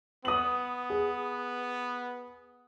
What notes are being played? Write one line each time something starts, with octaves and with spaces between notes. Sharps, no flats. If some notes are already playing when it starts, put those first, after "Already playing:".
B3 D#6 F#7
G#4